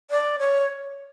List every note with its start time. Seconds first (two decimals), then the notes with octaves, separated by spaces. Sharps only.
0.11 D5
0.39 C#5